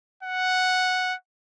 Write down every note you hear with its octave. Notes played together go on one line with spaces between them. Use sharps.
F#5